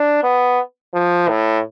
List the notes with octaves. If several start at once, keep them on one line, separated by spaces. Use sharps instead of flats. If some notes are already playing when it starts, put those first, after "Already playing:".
Already playing: D4
B3
F3
A2